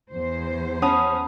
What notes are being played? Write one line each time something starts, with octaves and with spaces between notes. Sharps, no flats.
E2 C5
C#4 F#5 A5 B5 D#6